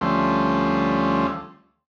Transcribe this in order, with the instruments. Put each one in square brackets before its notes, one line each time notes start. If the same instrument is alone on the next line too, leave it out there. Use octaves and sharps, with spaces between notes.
[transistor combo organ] D2 F3 G3 A3 C#4 C6